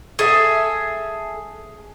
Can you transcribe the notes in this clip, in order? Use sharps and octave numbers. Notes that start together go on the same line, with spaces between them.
G#4 A4 E5 G#5